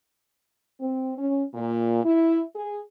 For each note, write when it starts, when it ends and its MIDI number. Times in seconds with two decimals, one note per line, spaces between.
0.80 1.13 60
1.18 1.44 61
1.54 2.02 46
2.04 2.43 64
2.55 2.81 68